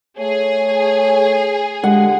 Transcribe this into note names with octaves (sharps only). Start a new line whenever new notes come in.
A3 G#4 C#5
D3 G#3 F4 G4 F#5